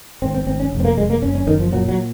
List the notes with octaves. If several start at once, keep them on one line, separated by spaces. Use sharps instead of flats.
G#1 C4
C4
G#1 C4
C#4
F1
C4
A#3
F1 G#3
A#3
F#1 C#4
C#4
F#1 D#3
F3
A#2 F#3
F#3